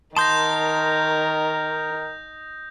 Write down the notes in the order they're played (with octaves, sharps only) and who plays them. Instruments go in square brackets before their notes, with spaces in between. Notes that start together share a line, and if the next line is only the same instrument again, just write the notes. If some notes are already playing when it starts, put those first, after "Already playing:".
[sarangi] D#3 [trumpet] A#4 [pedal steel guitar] A5 C6 [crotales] D#6 G6 A#6